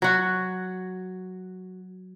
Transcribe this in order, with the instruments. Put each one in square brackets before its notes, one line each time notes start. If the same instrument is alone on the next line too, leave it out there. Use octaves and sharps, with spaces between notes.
[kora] F#3 F#4